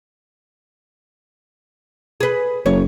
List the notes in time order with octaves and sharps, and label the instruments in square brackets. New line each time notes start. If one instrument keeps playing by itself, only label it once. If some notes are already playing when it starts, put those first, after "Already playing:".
[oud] G#4 B4
[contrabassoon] F#1 [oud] C#5